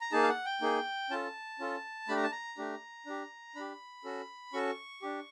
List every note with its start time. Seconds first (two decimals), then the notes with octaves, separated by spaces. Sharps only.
0.01 A#5
0.12 A#3 D#4 G#4 A5
0.23 F5
0.28 F#5
0.45 G5
0.61 A#3 D#4 G#4
1.10 C#4 F4 A4 A5
1.59 C#4 F4 A4
2.08 A3 D4 G4 B5
2.16 A#5
2.23 A5
2.32 A#5
2.58 A3 D4 G4
3.06 D4 G4
3.55 D4 G4 B5
4.04 C#4 F#4 A4
4.53 C#4 F#4 A4 C#6
5.02 D4 G4